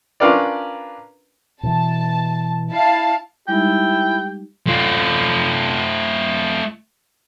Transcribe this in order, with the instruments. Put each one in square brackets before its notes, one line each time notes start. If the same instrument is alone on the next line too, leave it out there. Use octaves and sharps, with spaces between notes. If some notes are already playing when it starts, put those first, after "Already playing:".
[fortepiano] C#4 D4 F4 A#4 B4 D5
[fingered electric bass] B2 E3 [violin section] A5
[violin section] E4 F5 A5
[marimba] G3 G#3 D#4 [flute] E4 [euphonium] G4 [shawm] G5
[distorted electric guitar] A3 F4